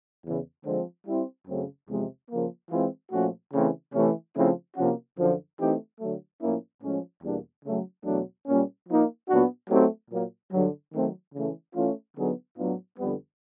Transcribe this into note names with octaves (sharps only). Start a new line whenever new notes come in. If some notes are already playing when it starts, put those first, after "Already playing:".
E2 C#3 E3
D3 F3 G#3 C4
G3 C4 E4
F#2 C#3 F#3 A3 C4
E2 C3 F3 G#3
C#3 F3 A#3
E3 G#3 C4 F4
A#2 F3 A3 C#4 F#4
C#3 E3 A3 C4
C3 E3 A3 C#4
C#3 F3 A3 C4 E4
C3 F3 A#3 C#4 F#4
F#2 D3 F3
E3 A3 C4 D#4 G4
D3 F#3 A3
A2 F3 A#3 C#4 E4
A2 F3 G#3 C#4
E2 B2 G3 A#3 D4
C#3 F#3 A3 C#4
E2 B2 F#3 A3 D4
A#2 G3 A#3 C#4
F3 A#3 D#4
A#2 F#3 B3 D4 F#4
F#3 A3 C4 D#4 G4
A#2 F#3 A#3
G2 D3 F#3
D#3 F#3 A3 C4
C#3 E3 A3 C#4
E3 A3 C#4 F4
D3 F#3 B3 D#4 G#4
A2 F#3 B3 D4 F4
F2 D3 G3 B3